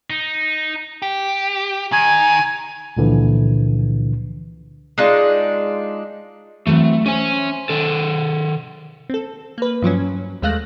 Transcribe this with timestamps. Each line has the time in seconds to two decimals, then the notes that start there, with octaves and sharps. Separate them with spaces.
0.10 D#4
1.02 G4
1.92 D#3 G#5
2.97 C#2 A#2 D3 E3 F3
4.98 G#3 D4 D#4 F4
6.67 E3 F#3 A3 C4
7.06 C#4 C5 E5 G#5
7.69 D#3 A4
9.10 C4 A4
9.58 A#3 B4
9.82 G2 F3 F#3 C#4
10.42 D#2 G#3 A3 F5 F#6 A#6